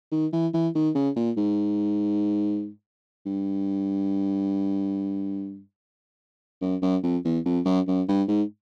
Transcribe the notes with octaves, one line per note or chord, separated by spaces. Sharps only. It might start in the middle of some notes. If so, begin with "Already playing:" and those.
D#3
E3
E3
D#3
C#3
A#2
G#2
G2
F#2
F#2
F2
E2
F2
F#2
F#2
G2
G#2